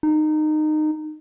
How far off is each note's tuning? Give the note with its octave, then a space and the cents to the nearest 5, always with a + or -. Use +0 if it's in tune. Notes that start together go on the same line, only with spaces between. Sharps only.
D#4 -20